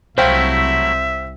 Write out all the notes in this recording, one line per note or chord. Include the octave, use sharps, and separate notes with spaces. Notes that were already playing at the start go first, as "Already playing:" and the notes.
C2 F#3 A3 E4 C5 E5 F5 G5